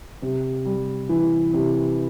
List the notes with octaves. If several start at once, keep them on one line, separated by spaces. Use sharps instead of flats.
C3
G3
E3
C3